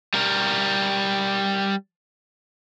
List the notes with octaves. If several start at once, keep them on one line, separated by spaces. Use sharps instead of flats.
G3 A#4